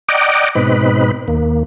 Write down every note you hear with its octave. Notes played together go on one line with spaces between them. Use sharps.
D5 D#5 F#5 G5 A#5 D6
G#2 B2 C4 D#4 B4 B5
D#2 A#3